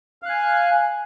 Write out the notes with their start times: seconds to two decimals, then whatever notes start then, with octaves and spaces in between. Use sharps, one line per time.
0.23 F5
0.26 F#6
0.29 G#5